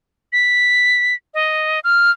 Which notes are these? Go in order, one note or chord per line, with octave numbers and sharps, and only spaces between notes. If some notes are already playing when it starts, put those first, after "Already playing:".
B6
D#5
F6